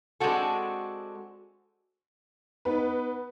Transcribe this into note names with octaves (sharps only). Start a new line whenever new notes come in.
G#3 C4 D4 F#4 A4
B3 D#4 B4